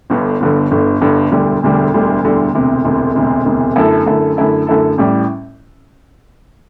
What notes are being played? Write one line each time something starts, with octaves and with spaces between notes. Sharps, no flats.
G1 G2 D3
G1 G2 D3
G1 G2 D3
G1 G2 D3
E1 D2 D3 G3
E1 D2 D3 G3
E1 D2 D3 G3
E1 D2 D3 G3
E1 D2 C3
E1 D2 C3
E1 D2 C3
E1 D2 C3
F#2 D3 A3 E4 A4
F#2 D3 A3 E4 A4
F#2 D3 A3 E4 A4
F#2 D3 A3 E4 A4
A1 A2 G3